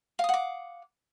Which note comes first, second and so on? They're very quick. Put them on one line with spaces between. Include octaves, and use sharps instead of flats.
F5 D#6 F#5 D6